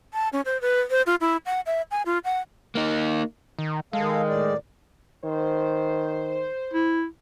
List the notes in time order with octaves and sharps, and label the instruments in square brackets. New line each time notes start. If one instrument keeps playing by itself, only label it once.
[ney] A5
C#4
C5
B4
C5
F4
E4
F#5
E5
G#5
F4
F#5
[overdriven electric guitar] A#3 D#4
[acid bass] D#3
[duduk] D#3 [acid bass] G#3 [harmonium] A4 F5
[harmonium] A2 D5
[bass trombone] D#3 [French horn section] C5
[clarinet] E4